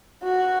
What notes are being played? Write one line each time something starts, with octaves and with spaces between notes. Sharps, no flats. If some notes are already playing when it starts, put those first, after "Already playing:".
F#4